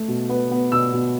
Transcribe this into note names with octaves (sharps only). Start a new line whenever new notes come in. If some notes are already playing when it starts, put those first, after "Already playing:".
Already playing: A3
B2
B3
B3
B2 E6
B2